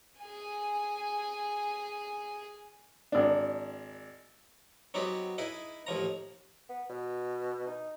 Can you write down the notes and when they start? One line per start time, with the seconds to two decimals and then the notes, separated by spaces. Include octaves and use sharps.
0.21 G#4 G#5
3.12 G#1 D4
4.94 F#3 B3 C4 D#4 G4 G#4
5.38 D#4 E4 G#4 B4
5.87 A1 D#2 F3 A#5
6.69 B3
6.90 B2
7.67 D#4